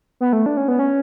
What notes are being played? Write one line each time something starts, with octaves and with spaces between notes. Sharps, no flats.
B3
A3
D4
C#4
B3
C#4